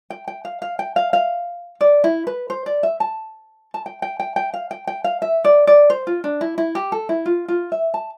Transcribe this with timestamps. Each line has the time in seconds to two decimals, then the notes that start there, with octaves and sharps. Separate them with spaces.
0.10 G5
0.28 G5
0.45 F5
0.62 F5
0.79 G5
0.96 F5
1.13 F5
1.81 D5
2.04 E4
2.27 B4
2.50 C5
2.66 D5
2.83 E5
3.00 A5
3.74 A5
3.86 G5
4.02 G5
4.20 G5
4.36 G5
4.54 F5
4.71 G5
4.87 G5
5.04 F5
5.22 E5
5.44 D5
5.67 D5
5.90 C5
6.07 F4
6.24 D4
6.41 E4
6.58 E4
6.75 G4
6.92 A4
7.09 E4
7.26 F4
7.48 F4
7.72 E5
7.94 A5